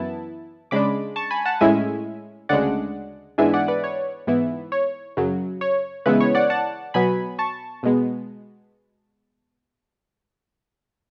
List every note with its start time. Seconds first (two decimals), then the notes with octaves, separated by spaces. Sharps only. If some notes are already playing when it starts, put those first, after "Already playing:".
Already playing: F#2 E3 B3 E4 A5
0.71 C#3 G#3 D4 B5 D6
1.16 A5 C#6
1.31 G#5 B5
1.45 F#5 A5
1.61 A2 G#3 C#4 E4 E5 G#5
2.49 D2 C#3 G#3 D4 D5 F#5
3.38 G#2 E3 G#3 B3 D4 E5 G#5
3.54 D5 F#5
3.68 B4 D5
3.84 C#5
4.27 G#2 E3 B3 E4
4.72 C#5
5.17 F#2 C#3 F#3
5.61 C#5
6.06 C#3 E3 G#3 B3 E4 B4
6.20 C#5
6.35 D5 F#5
6.50 F#5 A5
6.94 B2 F#3 B3 G#5 B5
7.39 A5 C#6
7.83 B2 G#3 B3